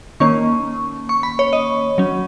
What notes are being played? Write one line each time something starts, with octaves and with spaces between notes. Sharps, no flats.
D#3 A#3 C#4 C#6
C#6
B5
C#5
D#5
F#3 C#4